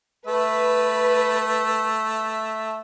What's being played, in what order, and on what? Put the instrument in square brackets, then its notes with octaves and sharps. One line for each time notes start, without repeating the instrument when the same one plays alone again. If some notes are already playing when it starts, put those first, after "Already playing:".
[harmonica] A3 E5 [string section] B4